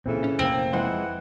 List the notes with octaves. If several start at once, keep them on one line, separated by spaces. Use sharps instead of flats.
A#2 C#3 E3 C4 A4
C#4
F1 A#3 C4
E3 F3 G#3 C5 F#5